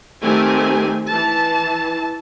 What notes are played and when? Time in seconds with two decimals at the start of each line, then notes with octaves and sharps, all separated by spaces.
0.21 D#3 A3 C4 G4 G#5
1.08 E3 A5